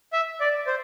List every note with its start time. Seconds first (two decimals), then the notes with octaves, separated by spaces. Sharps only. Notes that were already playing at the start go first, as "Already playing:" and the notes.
0.13 E5
0.41 D5
0.67 C5